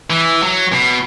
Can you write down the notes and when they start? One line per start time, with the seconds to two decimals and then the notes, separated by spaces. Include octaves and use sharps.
0.10 E3
0.43 F#3
0.73 B2